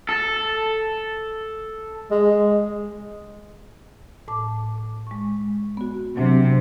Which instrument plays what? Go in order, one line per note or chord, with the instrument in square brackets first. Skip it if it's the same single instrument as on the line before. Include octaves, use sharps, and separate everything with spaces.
[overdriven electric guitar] A4
[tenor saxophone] G#3
[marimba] A2 A5 D6
G#3 C#6
B3 F#4
[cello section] C3 [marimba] E3 F#3 D4